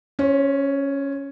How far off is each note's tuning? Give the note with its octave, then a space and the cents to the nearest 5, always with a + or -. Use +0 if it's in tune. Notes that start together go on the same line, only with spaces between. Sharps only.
C#4 +0 C5 +35